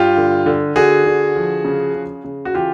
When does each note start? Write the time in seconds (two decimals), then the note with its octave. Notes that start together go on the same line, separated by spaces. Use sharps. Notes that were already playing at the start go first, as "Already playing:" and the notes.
Already playing: G2 F4 G4
0.17 D3
0.46 D3
0.76 D3 F#4 G#4
1.06 D3
1.36 F3
1.65 C#3
1.95 C#3
2.24 C#3
2.45 F#4
2.55 E3 F4 G4